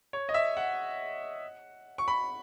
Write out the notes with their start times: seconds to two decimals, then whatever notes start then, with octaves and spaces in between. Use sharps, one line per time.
0.13 C#5
0.29 D#5
0.34 E5
0.57 F#5
1.98 C#6
2.08 B5